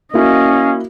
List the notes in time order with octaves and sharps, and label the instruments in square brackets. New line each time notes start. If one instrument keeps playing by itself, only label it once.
[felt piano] A#3 E4 F#4 [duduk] C#4 [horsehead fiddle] D#5 F5